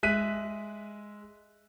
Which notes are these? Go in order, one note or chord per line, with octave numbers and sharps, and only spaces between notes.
G#3 E5 F#6 B6 D#7